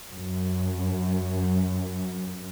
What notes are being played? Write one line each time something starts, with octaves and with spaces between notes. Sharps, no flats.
F#2